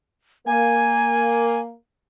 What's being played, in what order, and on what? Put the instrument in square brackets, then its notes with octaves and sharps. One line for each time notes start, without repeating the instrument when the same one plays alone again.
[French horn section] A#3 [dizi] G#5